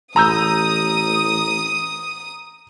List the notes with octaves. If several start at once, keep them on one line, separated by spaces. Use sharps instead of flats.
A1 A#5 D#6 E6 G6